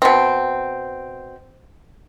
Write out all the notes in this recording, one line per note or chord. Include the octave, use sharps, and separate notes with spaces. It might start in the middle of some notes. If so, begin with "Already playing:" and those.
B2 C4